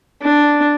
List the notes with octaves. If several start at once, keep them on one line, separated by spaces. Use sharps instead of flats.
D4